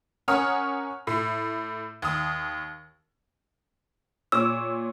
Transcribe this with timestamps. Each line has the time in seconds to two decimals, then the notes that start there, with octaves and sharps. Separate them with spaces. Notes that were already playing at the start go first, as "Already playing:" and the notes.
0.28 C#4 A#4 C#5 F#5 D#6 F6
1.07 A2
2.02 D#2 D#6
4.32 A#2 C#5 D6 E6